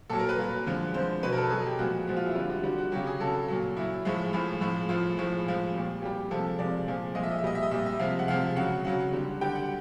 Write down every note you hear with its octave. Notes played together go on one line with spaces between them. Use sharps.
A#2 F#3 A4
A#4
B4
A#2 F#3
D3 F3 G#3
D3 F3 G#3 C5
B2 F#3 B4
A#4
A4
B2 F#3 G#4
G4
A#2 F3 G#3 F#4
A#2 F3 G#3 F#4
F4
E4
D3 G3 F4
F#4
D3 G3 F#4
F#4
C#3 F#3 G4
G#4
C#3 F#3 A4
A#2 F#3
A#2 F#3 E4
A2 F3 G#3
A2 F3 G#3 F4
A2 F3 G#3
A2 F3 G#3 F4
A2 F3 G#3
A2 F3 G#3
A#2 G3
A#2 G3 G4
C3 F3 G#3 A4
C3 F3 G#3 D5
A#2 F3 G#3
A#2 F3 G#3 D#5
E5
D#5
E5
A#2 G3 D#5
E5
D#5
A#2 G3 E5
E5
C3 F3 G#3 F5
F#5
C3 F3 G#3 F5
C#3 F#3 F#5
C#3 F#3 F#5
D3 G3
D3 G3 G5
F#5